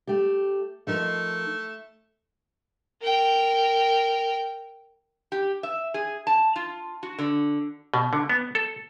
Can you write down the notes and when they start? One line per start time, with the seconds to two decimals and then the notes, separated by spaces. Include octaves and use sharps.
0.07 A3 G4
0.87 F3 A3 D#4 A#4
3.02 A#4 G5
5.32 G4
5.63 E5
5.94 G#4
6.27 A5
6.56 F4
7.03 F#4
7.18 D3
7.94 B2
8.13 D3
8.30 B3
8.55 A4